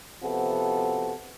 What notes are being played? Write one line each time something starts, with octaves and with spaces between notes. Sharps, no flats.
C3 F3 B3 F#4 A4